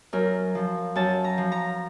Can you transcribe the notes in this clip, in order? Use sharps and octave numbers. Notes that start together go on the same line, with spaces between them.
F#2 A#4
F3
F#2 A5
A#5
F3
A#5